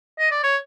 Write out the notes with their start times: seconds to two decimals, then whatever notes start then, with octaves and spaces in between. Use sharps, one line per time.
0.19 D#5
0.31 D5
0.43 C#5